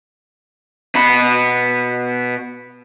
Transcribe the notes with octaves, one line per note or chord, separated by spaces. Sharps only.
B2 B5